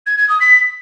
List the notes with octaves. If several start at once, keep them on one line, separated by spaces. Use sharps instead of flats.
G#6
G#6
D#6
B6